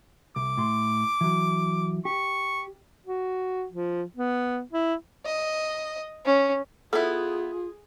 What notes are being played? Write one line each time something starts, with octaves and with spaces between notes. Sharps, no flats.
C2 D6
A2 C6
E3 F#3
G4 C#6
F#4
F3
B3
E4
D#5
C#4
B3 E4 F4 G#4 A4